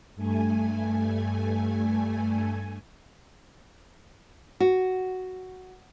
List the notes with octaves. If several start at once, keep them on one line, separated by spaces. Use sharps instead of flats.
G2 A3 G#5
F#4